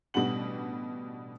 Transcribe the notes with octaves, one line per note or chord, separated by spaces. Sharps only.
A1 B2 G3 D4 F#5 F#7